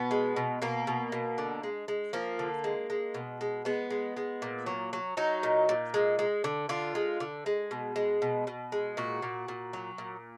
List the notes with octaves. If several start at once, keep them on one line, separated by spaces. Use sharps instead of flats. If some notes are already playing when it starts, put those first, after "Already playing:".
Already playing: B2 B3
G#3
B2
B2 A#3
B2
B2
D3
G#3
G#3
F3 A#3
D3
G#3
G#3
B2
G#3
G#3 B3
G#3
G#3
A#2
F#3
F#3
F#3 D#4
A#2
A#2
G#3
G#3
D3
D3 F4
G#3
D3
G#3
B2
G#3
B2
B2
G#3
A#2 F#4
A#2
A#2
F#3
A#2